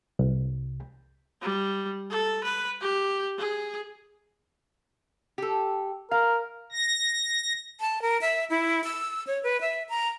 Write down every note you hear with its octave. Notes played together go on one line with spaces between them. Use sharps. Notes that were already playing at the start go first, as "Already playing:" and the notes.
C2
G3
A4
B4
G4
G#4
G4 A4
A#4 F5
A#6
A5
A#4
E5
E4
E6
C#5
B4
E5
A#5